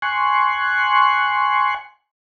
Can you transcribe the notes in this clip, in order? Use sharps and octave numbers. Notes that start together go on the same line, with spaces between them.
G#5 C6 C#6 F#6